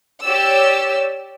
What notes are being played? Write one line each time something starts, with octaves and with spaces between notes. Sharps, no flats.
G4 C#5 D5 E6